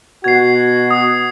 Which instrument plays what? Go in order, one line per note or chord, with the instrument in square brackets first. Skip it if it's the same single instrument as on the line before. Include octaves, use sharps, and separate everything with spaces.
[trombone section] B2 F#4 [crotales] G#6 C7
[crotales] D#6